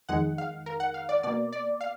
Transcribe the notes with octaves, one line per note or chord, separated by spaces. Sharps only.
F2 D#3 G#3 F#5
F5
A#4
F#5
F5
D5
B2 A#3 D5
D5
F5